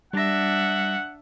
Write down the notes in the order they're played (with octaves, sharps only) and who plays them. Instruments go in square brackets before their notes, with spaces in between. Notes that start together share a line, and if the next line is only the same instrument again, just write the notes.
[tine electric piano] G3 A#6 [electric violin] D4 E5 [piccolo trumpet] F#5